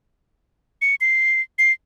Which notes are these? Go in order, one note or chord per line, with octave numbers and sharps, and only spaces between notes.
C#7
C7
C7